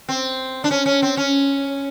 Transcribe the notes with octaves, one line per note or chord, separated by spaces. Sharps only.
C4
D4
C#4
C#4
C4
C#4